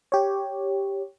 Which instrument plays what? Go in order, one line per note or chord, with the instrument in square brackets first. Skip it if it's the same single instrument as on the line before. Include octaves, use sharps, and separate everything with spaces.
[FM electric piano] G4 C#5